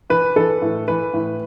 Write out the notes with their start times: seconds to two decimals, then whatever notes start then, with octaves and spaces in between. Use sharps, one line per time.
0.10 E3 B4
0.36 E3 A4
0.62 A2
0.88 E3 B4
1.14 A2